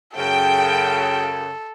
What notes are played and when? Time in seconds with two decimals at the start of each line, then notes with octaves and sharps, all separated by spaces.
0.17 F#2 C#3 A4 G5